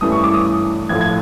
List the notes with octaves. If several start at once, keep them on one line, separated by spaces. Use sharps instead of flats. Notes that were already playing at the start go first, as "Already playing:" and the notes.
G2 E3 A3 C#4 E4 D#6
C#6
D6
D#6
A1 A2 F3 A3 G#6
G#6